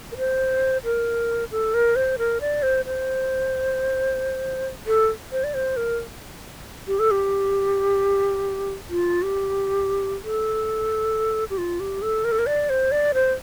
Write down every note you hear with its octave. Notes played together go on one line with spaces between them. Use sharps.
A#4
C5
A#4
A4
A#4
C5
A#4
D5
C5
C5
A4
C5
D5
C5
A#4
G4
A4
G4
F4
G4
A4
G4
F4
G4
A4
A#4
A4
A#4
D5
C5
D5
C5